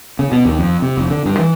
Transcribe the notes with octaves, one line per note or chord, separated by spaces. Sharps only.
C#3
B2
D#2
F2
C3
F1
D3
G2
E3